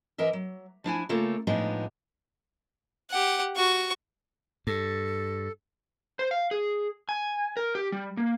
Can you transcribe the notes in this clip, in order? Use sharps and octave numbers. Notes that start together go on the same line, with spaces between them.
E3 A#4 D#5 E5
F#3
F3 D4 E4 G#5
C#3 A3 A#3 F4 A4
A2 F3 G#3 B3 D4 D#4
G4 F#5
F#4 C#6
G2 A4
C5
F5
G#4
G#5
A#4
G4
G3
A#3